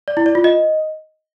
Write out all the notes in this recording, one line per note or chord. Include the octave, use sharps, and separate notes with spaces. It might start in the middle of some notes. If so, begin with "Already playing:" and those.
D5
E4
D5
F4
D#5